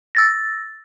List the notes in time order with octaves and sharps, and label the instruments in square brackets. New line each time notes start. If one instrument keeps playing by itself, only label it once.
[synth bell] E6 A6 A#6